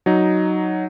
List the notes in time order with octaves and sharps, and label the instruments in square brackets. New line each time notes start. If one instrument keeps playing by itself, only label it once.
[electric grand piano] F#3 D#4